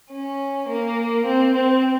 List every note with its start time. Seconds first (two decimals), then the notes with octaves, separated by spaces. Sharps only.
0.12 C#4
0.69 A#3
1.25 C4
1.54 C4